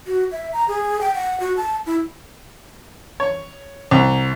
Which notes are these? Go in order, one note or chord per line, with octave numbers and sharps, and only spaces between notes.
F#4
E5
A#5
G#4
G5
F#5
F#4
A5
E4
C#5
C2